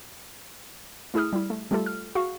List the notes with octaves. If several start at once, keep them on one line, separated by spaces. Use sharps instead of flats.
A3 E4 G#4 D#6 F6
G3 E4
A3
G3 A3 F4 G4 A4
F6
F#4 G#4 F5 C#6